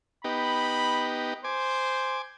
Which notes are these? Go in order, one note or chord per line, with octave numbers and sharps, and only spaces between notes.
B3 D#4 G4 B5
C5 G#5 D6